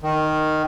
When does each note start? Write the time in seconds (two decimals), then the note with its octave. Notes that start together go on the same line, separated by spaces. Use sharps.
0.02 D#3